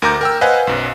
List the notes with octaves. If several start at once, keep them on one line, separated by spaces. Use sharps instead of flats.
D2 A#4 A#5 D6 G6
A#4 G5 E6
B4 C5 D#5 F5 F#5 G#5
B1 F#2